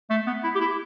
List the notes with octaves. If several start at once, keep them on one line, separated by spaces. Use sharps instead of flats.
A3
B3
E4
G4
E4